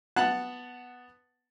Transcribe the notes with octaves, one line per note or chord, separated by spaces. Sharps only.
B3 F#5 A5 F#6